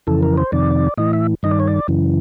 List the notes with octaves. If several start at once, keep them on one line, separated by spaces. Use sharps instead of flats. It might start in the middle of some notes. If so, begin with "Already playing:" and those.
F2 C#3 E3 A4
A#4
C5
F2 C3 D#3 D5
A2 E3 D#5
E5
G2 D#3 D#5
D5
C#5
D5
F#2 C#3 E3